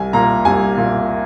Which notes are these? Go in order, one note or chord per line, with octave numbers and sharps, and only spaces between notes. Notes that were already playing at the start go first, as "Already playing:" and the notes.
Already playing: C2 G#5
A#2 A#5
C2 G#5
A#2